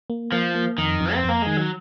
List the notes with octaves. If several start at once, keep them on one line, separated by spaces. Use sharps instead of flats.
A#3
F3 A#3
A#3
F2 D#3
F2
C4
F2 A#3
D#3 G#3
F#3